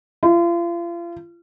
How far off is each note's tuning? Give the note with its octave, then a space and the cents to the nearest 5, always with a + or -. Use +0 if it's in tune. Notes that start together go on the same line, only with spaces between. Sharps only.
F4 -35